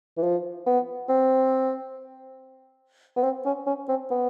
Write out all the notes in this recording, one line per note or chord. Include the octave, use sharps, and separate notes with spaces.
E3
F3
B3
C4
B3
C4
C#4
C#4
C4
B3